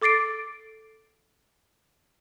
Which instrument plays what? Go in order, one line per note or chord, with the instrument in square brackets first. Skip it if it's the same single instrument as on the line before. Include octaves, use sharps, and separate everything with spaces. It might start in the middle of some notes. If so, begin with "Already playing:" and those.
[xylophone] A4 D6 A6 C7 D7